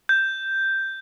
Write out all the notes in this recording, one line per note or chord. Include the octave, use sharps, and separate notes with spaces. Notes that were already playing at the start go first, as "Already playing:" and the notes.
G6